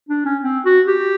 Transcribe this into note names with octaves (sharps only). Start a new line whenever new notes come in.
D4
C#4
C4
F#4
G4